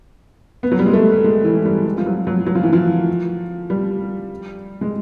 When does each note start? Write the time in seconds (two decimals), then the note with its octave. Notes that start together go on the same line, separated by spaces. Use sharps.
0.63 B3
0.72 F#3
0.79 G3
0.86 G#3
0.93 A3
1.24 G#3
1.44 E3
1.65 G3
1.86 G3
1.98 F3
2.06 F#3
2.27 F#3
2.47 F#3
2.55 F3
2.63 E3
2.73 F3
3.70 G3
4.81 G#3